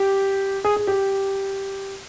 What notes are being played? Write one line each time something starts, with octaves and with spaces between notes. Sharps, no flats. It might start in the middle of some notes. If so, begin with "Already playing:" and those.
Already playing: G4
G#4
G#4
G4